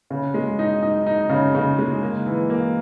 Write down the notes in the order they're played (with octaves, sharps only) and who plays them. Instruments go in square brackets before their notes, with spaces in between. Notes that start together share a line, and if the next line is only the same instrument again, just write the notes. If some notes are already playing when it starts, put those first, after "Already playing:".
[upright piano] C#3
G#3
D#4
D#4
D#4
C#3
C#3
G#3
A#3
E3
A#3